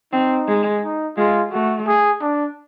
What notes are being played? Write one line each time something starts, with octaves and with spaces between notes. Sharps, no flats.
C4 D#4
G#3
D#4
G#3 F4
A3 F#4
G#4
D4